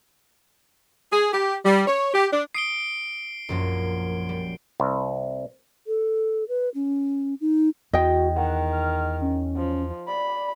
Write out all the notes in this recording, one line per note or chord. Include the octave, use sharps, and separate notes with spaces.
G#4
G4
G3
C#5
G4
D4
D#6 C7 D7 G7
A#1 F#2 F3
G3
C2
A4
B4
C#4
D#4
E2 F#4 D#5 G5
D#3 F#5
F6
C#4
F3
D5 B5